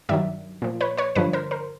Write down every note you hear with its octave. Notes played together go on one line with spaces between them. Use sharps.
G2 D#3 F#3 D5 E5
A#2 F3
B4 C#5
B4 C#5
G2 D3 F3 B4 C#5
A#4 C5
A#4 C5